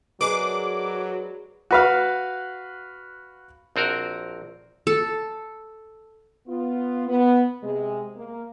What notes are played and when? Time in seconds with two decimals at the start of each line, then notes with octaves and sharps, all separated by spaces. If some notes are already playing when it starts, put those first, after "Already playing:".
0.21 F#3 G#3 D4 G#4 A#4 B4 D6
1.71 F#4 B4 F5
3.76 A#1 C4 F#4 A#4
4.87 A4
6.47 B3 F4
7.08 B3
7.62 C3 G#3
8.17 A#3